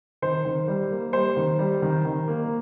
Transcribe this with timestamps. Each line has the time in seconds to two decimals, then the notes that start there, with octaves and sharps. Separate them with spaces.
0.22 D#3 C5
0.45 D#3
0.68 G3
0.91 A#3
1.13 G3 C5
1.37 D#3
1.59 G3
1.82 D#3
2.05 D#3
2.28 A#3